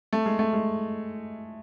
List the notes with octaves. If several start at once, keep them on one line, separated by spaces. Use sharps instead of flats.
A3
G#3
A3
G#3